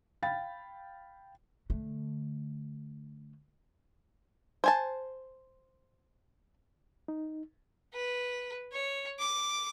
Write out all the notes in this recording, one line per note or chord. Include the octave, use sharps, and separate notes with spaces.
F5 G5 B5 A6
D3 A3
C5 G#5 A5
D#4
B4
C#5
D6